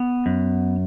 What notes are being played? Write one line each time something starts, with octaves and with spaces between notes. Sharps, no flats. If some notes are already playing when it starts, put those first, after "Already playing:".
Already playing: B3
F#2